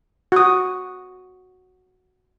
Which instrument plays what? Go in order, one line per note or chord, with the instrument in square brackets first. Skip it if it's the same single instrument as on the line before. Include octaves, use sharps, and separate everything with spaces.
[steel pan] F#4 D#6